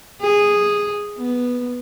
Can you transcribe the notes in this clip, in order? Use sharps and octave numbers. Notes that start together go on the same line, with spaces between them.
G#4
B3